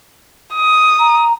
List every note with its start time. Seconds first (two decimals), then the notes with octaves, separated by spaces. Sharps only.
0.55 D#6
0.99 A#5